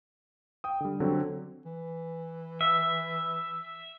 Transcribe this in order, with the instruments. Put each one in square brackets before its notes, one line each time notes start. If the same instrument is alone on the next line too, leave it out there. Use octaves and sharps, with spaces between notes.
[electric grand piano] G5 D#6
D3 G3
D3 F#3 C4
[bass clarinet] E3
[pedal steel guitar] E5